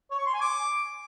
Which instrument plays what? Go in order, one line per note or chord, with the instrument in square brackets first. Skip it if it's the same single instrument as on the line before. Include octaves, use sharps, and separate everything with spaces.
[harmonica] C#5
C#6
C6
G#5
D6